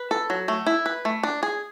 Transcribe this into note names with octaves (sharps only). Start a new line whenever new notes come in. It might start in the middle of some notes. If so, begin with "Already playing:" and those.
Already playing: B4
A4
F#3
A3
E4
B4
A3
D4
G#4